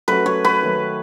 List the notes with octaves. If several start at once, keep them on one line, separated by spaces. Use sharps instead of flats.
F#3 A3 C#4 F#4 A4 B4
C#5
B4
D#3 F#3 A3